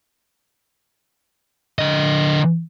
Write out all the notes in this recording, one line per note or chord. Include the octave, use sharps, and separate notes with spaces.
D3 D#5